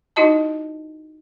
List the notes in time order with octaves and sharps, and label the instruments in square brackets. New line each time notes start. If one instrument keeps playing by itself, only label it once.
[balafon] D#4 E4 F#4 D#5 A5